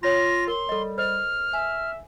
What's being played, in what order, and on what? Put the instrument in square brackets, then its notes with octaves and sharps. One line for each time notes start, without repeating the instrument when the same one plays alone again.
[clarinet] F4 [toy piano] C#5 B5 [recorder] A#6
[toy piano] A#4 [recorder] C6
[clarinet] G3 [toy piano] A4 D#5
[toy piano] C5 D#5 [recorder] F6
[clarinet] E5 [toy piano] G#5